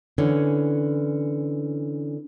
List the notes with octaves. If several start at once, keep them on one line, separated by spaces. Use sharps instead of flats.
D3 E3 C#4